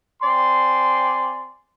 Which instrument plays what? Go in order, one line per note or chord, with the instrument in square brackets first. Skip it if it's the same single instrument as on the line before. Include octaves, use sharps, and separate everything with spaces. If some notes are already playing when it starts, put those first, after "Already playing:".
[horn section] C4 D5 G#5 C6